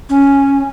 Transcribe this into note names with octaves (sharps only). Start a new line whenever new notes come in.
C#4